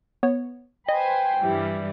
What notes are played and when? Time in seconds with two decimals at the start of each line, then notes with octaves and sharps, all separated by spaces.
0.23 B3 C#5
0.88 B4 C5 D#5 G5 G#5
1.39 G2 E3 G3